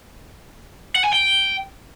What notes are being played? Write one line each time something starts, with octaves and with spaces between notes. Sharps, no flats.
F#5
G#5
G5